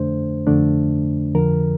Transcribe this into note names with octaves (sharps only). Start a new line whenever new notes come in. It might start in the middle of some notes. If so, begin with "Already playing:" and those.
Already playing: F2 D3 A3 D4 C5
F2 D3 A3 D4
F2 D3 F3 A#4